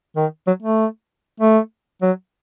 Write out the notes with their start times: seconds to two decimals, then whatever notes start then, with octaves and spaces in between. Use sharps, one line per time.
0.16 D#3
0.47 F#3
0.63 A3
1.40 A3
2.02 F#3